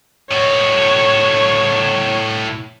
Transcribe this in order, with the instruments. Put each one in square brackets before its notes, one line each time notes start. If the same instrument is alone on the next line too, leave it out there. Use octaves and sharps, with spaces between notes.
[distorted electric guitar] A2 F#4 [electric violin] C#5